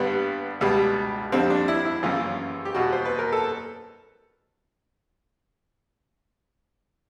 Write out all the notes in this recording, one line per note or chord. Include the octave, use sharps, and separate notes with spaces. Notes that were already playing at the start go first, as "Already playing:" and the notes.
Already playing: G2 D3 G3 B3
C#2 B2 G3
F2 D3 G3 C4
D4
E4
E4
F#2 C#3 E3 F4
G4
E2 B2 G3 F#4
C5
B4
A#4
A4